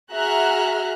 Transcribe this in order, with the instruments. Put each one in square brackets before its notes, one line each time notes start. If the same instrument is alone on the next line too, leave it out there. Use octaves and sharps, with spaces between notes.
[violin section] F#4 G#4 E5 A#5 F6 F#6